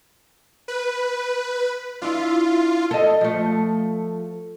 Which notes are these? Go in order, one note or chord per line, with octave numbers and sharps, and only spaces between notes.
B4
D4 E4 F4
A4 D#5
F3 A3